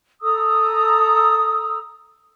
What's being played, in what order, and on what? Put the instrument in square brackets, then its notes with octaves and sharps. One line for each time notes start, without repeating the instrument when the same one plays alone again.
[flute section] A4 A#5 D#6 E6